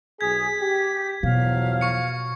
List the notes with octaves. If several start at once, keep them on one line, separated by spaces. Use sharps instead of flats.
B1 G#4 G#6 B6
G4
E2 B2 F3 F#3 F5
C#6 C#7